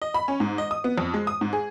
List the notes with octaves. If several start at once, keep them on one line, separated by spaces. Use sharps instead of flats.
D#5
B5
C#4
G#2
D#5
D#6
B3
F2
G#3
D#6
G#2
G#4